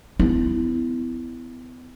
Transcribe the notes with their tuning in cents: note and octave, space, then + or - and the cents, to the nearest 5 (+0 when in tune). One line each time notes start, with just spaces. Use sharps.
B3 +35 E4 +0